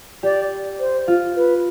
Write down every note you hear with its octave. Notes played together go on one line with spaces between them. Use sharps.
G4 D5
C5
F4
B4